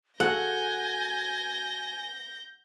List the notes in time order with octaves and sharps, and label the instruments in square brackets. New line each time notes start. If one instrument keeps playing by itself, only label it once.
[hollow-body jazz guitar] F#4 A4 [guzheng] F#5 [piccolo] G#5 [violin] G6 A#6